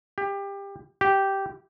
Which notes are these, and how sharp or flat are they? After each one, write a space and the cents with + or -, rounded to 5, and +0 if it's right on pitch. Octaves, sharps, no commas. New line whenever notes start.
G4 +20
G4 -10